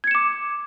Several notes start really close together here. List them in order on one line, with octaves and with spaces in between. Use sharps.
G#6 C#7 E7 D6